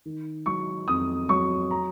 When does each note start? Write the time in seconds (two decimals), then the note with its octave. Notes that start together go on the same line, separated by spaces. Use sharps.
0.05 D#3
0.46 F#3 C#6
0.88 F2 D#6
1.29 F#3 C#6
1.71 A#5